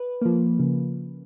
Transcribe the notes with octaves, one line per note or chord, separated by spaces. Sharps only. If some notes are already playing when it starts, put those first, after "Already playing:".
Already playing: B4
F3 A#3
C#3